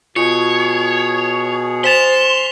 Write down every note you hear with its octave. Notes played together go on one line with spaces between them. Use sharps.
B2 F4 G#4 C#5 C#7
C5 G#5 C6 A6 B6 E7 F7